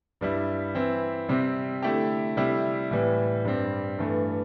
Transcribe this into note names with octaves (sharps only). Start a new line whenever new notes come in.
G2 G3 E4
E3 C4 E4
C3 G3 C4 G4
D3 A3 E4 G4
C3 G3 E4 G4
A2 E3 G3
G2 G3 C4
G2 E3 A3